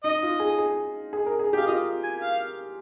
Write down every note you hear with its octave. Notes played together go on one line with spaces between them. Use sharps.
D#4 D#5
F4
G#4
G#4
G#4
A#4
G#4
G4 F5
F4 D#5
G#5
F5